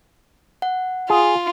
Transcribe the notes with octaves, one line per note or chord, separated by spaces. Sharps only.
F#5
F4 G#4